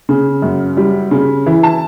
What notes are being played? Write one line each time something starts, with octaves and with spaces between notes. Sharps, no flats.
C#3
F#2
G3
C#3
E3
A5